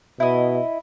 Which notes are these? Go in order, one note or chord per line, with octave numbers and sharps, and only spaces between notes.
B2 E4 D#5